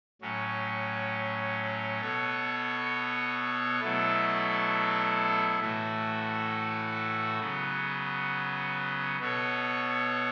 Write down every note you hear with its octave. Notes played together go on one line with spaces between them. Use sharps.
A2 F#3 C#4
B2 B3 A4 C#5
B2 F#3 A3 E4 A4
A2 E3 A3 F#4 A4
C#3 F#3 B3
B2 B3 A4 C#5